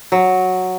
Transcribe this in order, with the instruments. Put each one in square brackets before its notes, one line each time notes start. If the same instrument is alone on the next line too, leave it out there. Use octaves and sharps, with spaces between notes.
[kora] F#3